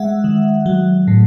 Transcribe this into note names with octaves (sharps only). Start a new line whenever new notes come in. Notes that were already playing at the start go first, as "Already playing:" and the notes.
Already playing: G#3 E5 F#5
D#3
F#3
A2